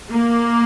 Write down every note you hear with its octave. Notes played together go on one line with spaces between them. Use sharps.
A#3